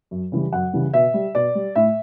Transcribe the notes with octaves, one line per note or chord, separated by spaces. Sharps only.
F#2
C#3 E3 G3
F#2 F#5
C#3 E3 G3
B2 E5
G3
B2 D5
G3
A2 E5